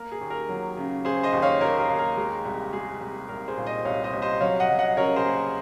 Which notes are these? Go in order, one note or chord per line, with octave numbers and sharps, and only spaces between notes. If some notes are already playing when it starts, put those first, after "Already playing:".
Already playing: A#3 A#4
G#4
D#2
A#4
F#3
C#3
C#3 G#4 C5
C5 D#5
D#2
C#5 F5
A#3 A#4 C#5
A#4
D#2
A#4
G#3
C2
G#3 G#4
C2
C2 A#4
G#4 C5
A#2
C5 D#5
C2 C#5 F5
C5 D#5
C2
C5 D#5
F#3 C#5 F5
D#5 F#5
F#3
D#5 F#5
C#3 A#4 C#5
G#4 C5
A#3